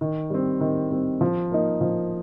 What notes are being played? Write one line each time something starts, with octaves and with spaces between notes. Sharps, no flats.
D#3
G3 C4
D#3
G3 C4
F3
A#3 D#4
F3